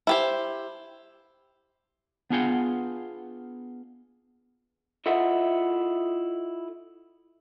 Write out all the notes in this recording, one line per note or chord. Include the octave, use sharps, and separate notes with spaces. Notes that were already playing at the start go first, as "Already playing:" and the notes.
E4 G4 C5
B3 D4 F4 G#4 F#5 G5
E4 F4 A4 D#5 E5 F#5